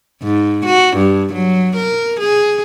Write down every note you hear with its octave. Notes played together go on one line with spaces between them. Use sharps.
G#2
F#4
G2
F#3
A#4
G#4